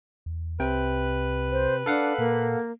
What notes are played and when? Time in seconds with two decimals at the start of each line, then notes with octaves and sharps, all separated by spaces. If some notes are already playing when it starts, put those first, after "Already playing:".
0.26 E2
0.60 C2 C3 B4 G5
1.52 C5
1.86 D4 A4 F5 F#5
2.18 A#2 A#3